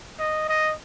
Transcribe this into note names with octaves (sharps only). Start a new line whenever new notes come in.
D#5
D#5